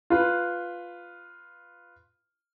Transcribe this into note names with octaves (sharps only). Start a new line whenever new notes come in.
F4 B4